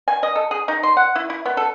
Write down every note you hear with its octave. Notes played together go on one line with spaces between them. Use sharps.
G#5
D#5
A4
G#4
D#4
C6
F#5
E4
E4
B3
A4